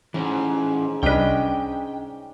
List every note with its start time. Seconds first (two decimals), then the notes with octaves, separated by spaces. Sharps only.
0.14 G#2 E3 C#4
1.03 C2 C#4 D4 B4 D#5 G5